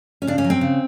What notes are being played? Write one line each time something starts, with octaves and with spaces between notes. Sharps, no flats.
C#4
C#3 D4
C#4
F#3
C4
C#3